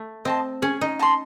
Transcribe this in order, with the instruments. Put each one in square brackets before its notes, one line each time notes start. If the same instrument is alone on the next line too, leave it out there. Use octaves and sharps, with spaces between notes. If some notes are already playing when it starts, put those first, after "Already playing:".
Already playing: [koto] A3
[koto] C4 [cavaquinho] D#5 A5 C6
[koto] C#4 [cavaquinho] G#4
[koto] D#4
[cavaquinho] D#5 A5 C6